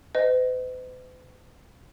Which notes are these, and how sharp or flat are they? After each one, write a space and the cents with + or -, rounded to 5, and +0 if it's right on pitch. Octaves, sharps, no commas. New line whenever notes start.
B4 +45 D#5 +0